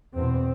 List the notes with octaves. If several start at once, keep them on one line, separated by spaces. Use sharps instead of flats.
E2 B2 C4